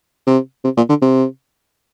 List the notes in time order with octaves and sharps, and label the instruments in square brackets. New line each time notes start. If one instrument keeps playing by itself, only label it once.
[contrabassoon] C3
C3
A#2
D3
C3